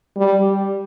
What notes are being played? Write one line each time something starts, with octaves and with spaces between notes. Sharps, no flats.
G3